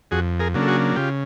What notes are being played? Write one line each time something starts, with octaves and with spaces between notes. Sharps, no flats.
F2 F#4 G#4
G#4 A#4
C#3 F#3 A#3 D4
A4
F#4 G#4
C#3 F4 G4